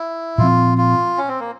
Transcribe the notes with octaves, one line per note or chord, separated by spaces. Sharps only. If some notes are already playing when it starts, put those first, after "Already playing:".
Already playing: E4
A#2 F3 C4 F4
F4
C#4
C4
A#3